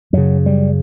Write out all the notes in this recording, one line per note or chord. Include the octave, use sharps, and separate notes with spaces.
F#2 C#3 F#3
G3